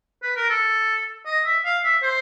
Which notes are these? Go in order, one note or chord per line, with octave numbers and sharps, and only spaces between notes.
B4
A#4
A4
D#5
E5
F5
E5
C5